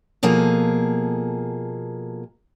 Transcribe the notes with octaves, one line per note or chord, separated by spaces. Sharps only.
B2 F3 A#3 G#4 A4